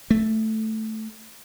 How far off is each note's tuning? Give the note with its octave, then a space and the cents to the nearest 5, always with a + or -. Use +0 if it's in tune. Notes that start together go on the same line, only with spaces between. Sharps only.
A3 +0